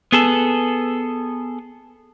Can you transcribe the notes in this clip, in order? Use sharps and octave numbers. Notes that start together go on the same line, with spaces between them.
B3 G#4 A4